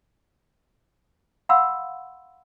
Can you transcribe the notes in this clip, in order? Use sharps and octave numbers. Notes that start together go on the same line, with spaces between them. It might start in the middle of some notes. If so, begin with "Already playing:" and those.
F5 F#5 B5 C6 E6